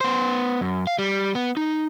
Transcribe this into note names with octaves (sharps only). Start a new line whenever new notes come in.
B3 C5
F#2
F5
G3
B3
D#4